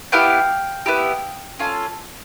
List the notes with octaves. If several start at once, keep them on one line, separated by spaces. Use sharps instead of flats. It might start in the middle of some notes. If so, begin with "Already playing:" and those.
B3 E4 G4 F5 G5
B3 E4 G4
C#4 F4 A4